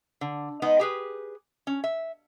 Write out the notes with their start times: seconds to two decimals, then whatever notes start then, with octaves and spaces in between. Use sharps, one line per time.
0.21 D3
0.62 G#3 B3 D#4 D#5
0.79 G4 G#4 B4
1.67 C#4
1.84 E5